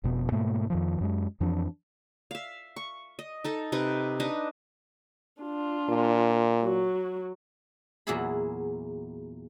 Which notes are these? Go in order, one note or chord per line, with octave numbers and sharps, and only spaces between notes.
F1 B2 B3
G#2 B2 A3 A#3
F2 D#3 F3
F#2 G#3
F2 E3 F3 D4
E5 F5
C#6
D#5
D#4 A4 D#5
C3 D#4 B4
D4 D#4 B4 D#5
D4 F4
A#2
F#3 F#4
E2 A#2 F#3 E4 G#4 B5